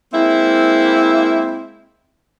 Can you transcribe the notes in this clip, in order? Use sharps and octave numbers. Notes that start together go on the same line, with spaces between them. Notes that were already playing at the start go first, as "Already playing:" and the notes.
G#3 A#3 C4 E4